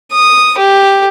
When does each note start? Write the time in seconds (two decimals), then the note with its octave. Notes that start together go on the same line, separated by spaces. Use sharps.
0.12 D#6
0.58 G4